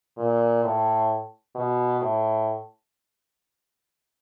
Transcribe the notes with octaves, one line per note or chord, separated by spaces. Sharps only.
A#2
A2
B2
A2